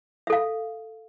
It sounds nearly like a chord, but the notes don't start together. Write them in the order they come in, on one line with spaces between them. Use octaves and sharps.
E5 A4 F5